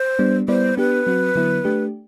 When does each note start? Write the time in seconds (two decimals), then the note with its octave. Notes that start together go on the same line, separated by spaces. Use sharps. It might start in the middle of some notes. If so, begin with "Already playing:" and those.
Already playing: C5
0.19 G3 B3 D4
0.48 G3 B3 E4 B4 C5 D5
0.77 B3 D4 G4 B4
1.07 F#3 C4 F#4
1.36 D3 F#3 B3 E4
1.65 A3 D4 G4